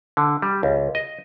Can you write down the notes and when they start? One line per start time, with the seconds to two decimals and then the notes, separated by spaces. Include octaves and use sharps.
0.17 D3
0.42 G3
0.63 C#2
0.95 D#5